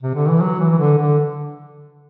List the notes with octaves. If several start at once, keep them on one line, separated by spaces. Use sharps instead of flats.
C3
D3
E3
F#3
E3
E3
D3
D3